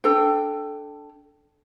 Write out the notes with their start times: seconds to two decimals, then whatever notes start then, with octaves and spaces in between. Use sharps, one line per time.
0.04 D4 A4 G5